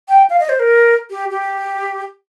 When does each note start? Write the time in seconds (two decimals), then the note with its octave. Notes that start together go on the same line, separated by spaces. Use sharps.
0.09 G5
0.30 F5
0.40 D#5
0.49 C5
0.59 A#4
1.10 G4
1.30 G4